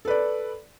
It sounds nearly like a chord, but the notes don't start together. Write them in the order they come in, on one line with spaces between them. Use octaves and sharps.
A4 B4 D5